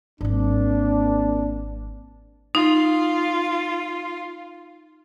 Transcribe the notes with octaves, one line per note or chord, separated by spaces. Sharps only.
G#1 F#3 A#3 C4 D4
D#4 F4